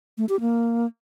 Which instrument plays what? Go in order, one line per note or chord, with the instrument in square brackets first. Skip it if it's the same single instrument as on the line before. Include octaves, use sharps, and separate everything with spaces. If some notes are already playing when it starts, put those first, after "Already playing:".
[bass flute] A3
G4
A#3